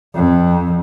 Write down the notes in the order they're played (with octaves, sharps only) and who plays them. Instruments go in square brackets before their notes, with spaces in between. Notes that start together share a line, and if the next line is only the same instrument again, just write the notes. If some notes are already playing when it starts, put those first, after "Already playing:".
[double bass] F2